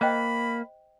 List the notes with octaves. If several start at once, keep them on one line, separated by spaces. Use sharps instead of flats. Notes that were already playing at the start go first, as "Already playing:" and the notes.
A#3 C5 D#5 G5 B5